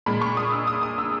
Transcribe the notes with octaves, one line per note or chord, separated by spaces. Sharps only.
A#2 G#3 B5
C#6
D#6
E6
D#6
D#6
E6